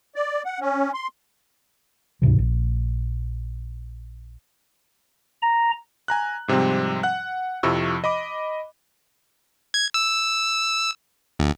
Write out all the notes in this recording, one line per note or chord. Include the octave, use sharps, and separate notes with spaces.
D5
F#5
C#4
C6
D2 G#2 C3 E3
A#1
A#5
G#5 A#5 F#6
G#2 C3 F3 G3 C4
F#5 F#6
F2 C3 F3 E4 C#6 E6
D#5 B5 D6
G#6
E6
D2